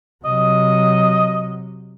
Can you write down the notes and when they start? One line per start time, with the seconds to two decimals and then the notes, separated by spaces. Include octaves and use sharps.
0.25 C3 F#3 D#5